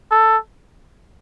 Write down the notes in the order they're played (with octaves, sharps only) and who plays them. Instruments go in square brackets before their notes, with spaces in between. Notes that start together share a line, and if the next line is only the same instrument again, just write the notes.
[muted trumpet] A4